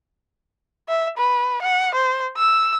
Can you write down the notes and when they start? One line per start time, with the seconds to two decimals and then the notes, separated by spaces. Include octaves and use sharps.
0.89 E5
1.17 B4
1.62 F#5
1.95 C5
2.37 E6